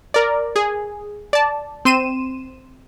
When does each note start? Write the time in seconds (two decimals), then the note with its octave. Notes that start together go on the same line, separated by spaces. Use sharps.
0.14 A#4 D5
0.56 G#4
1.33 D5 A5
1.85 C4 C6 D#7 E7